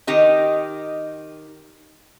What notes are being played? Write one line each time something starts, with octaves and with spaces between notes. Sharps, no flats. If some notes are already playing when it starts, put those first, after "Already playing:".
D#3 D#4 G4 D#5